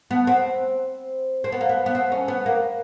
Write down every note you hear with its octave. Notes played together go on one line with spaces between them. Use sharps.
B3
C4
C4
B3
A#3
B3
B3
C4
C#4
B3
A#3